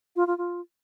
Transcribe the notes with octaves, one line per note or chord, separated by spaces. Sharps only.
F4
F4
F4